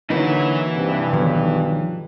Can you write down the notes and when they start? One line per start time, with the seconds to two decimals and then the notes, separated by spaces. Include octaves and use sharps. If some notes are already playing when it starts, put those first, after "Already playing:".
0.10 D3 E3 F#3 A#3 D#4 B4
0.76 G2 C3
1.13 B1 D#3 F3